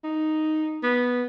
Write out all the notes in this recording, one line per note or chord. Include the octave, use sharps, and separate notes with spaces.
D#4
B3